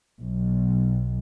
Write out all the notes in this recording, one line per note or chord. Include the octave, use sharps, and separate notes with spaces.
B1